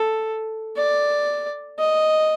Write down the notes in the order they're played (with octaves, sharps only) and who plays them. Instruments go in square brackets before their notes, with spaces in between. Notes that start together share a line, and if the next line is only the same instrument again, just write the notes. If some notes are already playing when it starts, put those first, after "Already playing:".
Already playing: [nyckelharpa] A4
D5
D#5